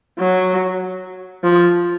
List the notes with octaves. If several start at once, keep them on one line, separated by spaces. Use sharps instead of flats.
F#3
F3